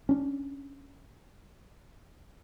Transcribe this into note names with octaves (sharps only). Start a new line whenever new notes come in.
C#4 D4